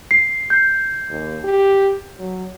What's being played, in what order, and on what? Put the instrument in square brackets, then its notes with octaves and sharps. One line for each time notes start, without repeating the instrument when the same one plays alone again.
[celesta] C7
G6 C7
[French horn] D#2
G4
F#3